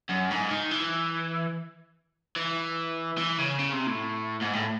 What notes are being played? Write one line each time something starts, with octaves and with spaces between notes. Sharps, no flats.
F#2
G#2
D#3
E3
E3
E3
C#3
C#3
C3
A2
G#2
A2